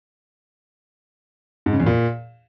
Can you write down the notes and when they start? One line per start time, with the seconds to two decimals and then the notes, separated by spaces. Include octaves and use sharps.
1.66 G#2
1.73 C#3
1.80 E2
1.86 A#2